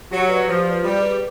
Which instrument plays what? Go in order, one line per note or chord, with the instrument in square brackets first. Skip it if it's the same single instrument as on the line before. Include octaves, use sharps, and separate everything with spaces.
[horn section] F#3 [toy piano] G4
[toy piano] B4 D5
[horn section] F3 [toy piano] G4
[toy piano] B4 D5
[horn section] G3 [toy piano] E4
[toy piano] G#4 B4